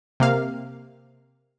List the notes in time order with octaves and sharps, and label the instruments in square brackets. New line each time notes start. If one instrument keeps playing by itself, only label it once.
[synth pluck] C3 A#3 F5